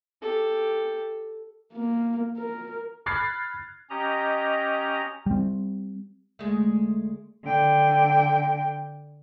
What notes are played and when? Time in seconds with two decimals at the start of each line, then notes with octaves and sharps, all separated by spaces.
0.22 G4 A4
1.73 A#3
2.38 A#4
3.06 B5 F6 F#6 G#6 A6 C7
3.90 C#4 G4 D#5 A#5
5.26 G3 C4
6.39 D2 G#3 A3
7.44 D3 G5